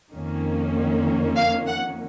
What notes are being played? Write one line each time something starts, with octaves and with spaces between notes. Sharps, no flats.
F2 D#3 A#3 C#4
F5
F#5